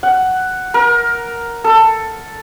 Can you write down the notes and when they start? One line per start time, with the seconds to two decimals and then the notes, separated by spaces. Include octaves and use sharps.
0.03 F#5
0.74 A#4
1.64 A4